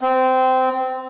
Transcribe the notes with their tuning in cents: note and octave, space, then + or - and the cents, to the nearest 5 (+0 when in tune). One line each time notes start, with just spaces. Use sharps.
C4 -15